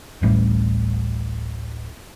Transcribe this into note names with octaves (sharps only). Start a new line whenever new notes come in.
D1 A1 A2 G3